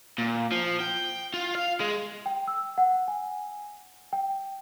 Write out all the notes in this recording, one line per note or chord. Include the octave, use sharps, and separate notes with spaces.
A#2
F3
G5
F4
F5
G#3
G5
E6
F#5
G#5
G5